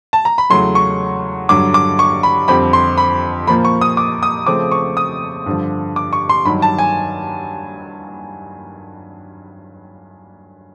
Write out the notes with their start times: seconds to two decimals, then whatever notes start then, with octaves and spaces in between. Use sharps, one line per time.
0.13 A5
0.25 A#5
0.38 B5
0.50 E2 C#3 F#3 A3 C6
0.75 C#6
1.49 G2 D3 F#3 D6
1.74 D6
1.99 C#6
2.23 B5
2.48 F2 D3 G3 C4 B5
2.73 C6
2.98 B5
3.47 A#2 F3 A#3 B5
3.65 C#6
3.81 D#6
3.97 D6
4.23 D#6
4.47 C#3 F3 A3 C4 D6
4.71 C#6
4.97 D#6
5.46 G2 D3 F3
5.96 D6
6.13 C#6
6.29 C6
6.45 G2 D#3 F#3 B5
6.62 A5
6.79 G#5